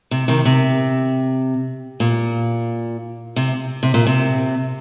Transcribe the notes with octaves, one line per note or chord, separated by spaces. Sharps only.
C3
C3 D#3
C3
A#2
C3
C3
A#2
C3